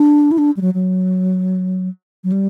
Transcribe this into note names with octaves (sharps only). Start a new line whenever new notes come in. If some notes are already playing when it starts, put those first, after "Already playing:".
Already playing: D4
E4
D4
G3
F#3
F#3
F#3
G3